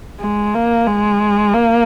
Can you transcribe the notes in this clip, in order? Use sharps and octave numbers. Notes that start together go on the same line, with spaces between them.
G#3
A#3
G#3
A#3